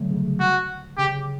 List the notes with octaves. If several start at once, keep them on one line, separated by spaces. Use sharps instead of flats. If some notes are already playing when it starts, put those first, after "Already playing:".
Already playing: D3 F#3 G3 A3
C#3
F#4
C#3 G4